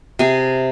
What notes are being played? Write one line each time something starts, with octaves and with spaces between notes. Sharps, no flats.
C3 G#4 G#5